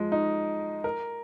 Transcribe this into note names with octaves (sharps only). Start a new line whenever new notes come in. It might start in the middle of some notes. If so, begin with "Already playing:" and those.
Already playing: F3 G#3
D#4
A#4